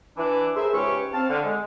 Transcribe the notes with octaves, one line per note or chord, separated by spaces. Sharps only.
E3 D4
G#4 A#4 C5 E5
C#2 G#2 C#4 G4 B4 C#6
C4 F5 A5
D3
G#3